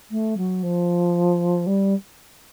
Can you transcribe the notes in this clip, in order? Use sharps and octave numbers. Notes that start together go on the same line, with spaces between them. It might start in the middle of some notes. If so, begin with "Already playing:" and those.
A3
F#3
F3
G3